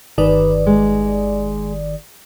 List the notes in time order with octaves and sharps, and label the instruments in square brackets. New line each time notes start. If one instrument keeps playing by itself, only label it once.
[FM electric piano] G1 D#3 D5 [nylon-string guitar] B4
[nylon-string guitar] G#3